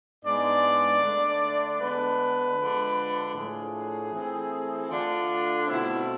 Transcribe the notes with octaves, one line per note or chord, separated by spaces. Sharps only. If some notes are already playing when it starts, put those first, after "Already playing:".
G#2 G#3 B3 D4 D5
D3 A3 D4
D3 G#3 B3 D4 B4
D3 F3 G#3 D4
A2 F3 A3 D4 G#4
E3 A3 C4
D3 A3 D4 F4
B2 A3 C4 E4